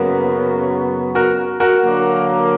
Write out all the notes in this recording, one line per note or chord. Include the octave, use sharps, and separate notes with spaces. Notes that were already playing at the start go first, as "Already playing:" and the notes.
Already playing: F#2 C#3 F#3 A#3 B3
F#4 A#4
F#4 A#4
D3 F#3 A#3